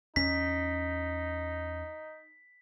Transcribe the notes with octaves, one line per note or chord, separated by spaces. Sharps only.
E2 C#4 D#4 B6